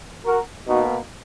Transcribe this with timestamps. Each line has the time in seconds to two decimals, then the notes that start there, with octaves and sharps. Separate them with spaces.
0.25 F#4 A#4
0.67 B2 A#3 D#4 F#4